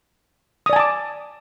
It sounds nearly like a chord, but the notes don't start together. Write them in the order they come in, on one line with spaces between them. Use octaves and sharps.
D#6 D5 G#5 A5 D6